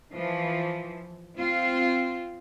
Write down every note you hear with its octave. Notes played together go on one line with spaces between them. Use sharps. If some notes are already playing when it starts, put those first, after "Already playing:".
E3 F3
C4 F4